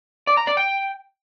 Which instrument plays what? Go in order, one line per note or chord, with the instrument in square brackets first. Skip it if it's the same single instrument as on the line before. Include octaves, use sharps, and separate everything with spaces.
[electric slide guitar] D5
A#5
D5
G5